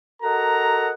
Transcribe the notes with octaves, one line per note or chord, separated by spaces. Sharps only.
F#4 A4 A#4 D#5 F#5 A#5